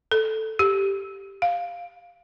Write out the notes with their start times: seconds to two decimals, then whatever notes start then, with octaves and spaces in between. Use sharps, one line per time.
0.11 A4
0.59 G4
1.42 F5